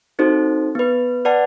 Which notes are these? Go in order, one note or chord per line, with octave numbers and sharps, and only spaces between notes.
C4 D#4 F#4 A4 C5
B3 B4
B4 D5 F#5 A5